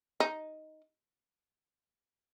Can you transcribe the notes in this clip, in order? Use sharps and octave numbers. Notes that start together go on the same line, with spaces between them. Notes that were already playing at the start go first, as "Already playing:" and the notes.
D#4